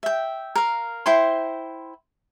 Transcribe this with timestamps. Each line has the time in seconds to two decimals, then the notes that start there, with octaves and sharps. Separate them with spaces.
0.03 E5 G5
0.56 A#4 F5
1.06 E4 C5 G5 C6